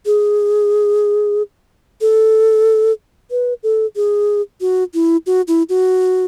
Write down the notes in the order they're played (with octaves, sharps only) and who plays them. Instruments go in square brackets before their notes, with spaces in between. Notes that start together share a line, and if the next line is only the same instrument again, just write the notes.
[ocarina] G#4
A4
B4
A4
G#4
F#4
E4
F#4
E4
F#4